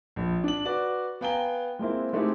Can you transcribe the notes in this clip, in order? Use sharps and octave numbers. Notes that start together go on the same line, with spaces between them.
A#1
D4 F#7
F#4 B4 D5
B3 F5 G5 G#5 A#5 G7
G#3 A#3 C4 E4
G#3 A3 C4 D#4 E4 G4